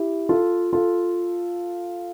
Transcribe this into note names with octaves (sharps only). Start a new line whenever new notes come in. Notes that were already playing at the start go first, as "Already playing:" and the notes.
Already playing: E4 G4
F4 A4
F4 A4